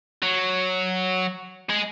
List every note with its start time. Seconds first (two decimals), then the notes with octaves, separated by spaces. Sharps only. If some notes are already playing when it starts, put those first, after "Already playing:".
0.23 F#3
1.69 G#3